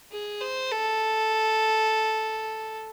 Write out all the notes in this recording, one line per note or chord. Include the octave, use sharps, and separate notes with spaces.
G#4
C5
A4